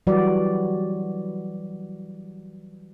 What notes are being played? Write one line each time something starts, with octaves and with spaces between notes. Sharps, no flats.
E3 F#3 G3 F#4 B4 D5